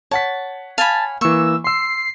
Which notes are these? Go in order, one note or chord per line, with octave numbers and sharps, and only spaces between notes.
C#5 F#5 A5 B6
F5 G#5 A5 B5
E3 A#3 C#6 E6
C6 E6 C7